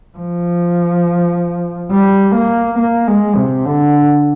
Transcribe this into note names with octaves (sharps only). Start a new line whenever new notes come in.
F3
G3
A#3
A#3
G#3
C3
D3